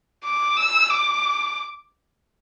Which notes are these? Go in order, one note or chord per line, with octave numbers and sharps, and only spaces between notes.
D6
E6
D6